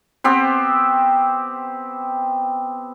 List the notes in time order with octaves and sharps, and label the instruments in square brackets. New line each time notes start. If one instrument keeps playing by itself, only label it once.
[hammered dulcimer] B3 C4 G4 C5